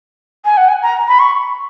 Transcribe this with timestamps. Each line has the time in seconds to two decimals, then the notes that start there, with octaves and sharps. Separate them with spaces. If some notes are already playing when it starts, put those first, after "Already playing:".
0.45 G#5
0.57 F#5
0.69 G#5
0.83 A#5
1.08 B5
1.19 C#6